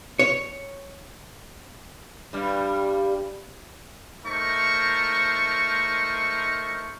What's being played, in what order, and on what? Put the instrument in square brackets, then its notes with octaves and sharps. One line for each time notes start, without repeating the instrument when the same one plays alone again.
[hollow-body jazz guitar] C#5
[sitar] G2 G3
[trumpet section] A3 D#4 A#4 C5 A#5 C#6